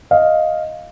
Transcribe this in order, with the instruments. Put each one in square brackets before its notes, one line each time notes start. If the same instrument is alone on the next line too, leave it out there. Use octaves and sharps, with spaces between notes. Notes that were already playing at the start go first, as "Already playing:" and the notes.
[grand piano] D#5 F5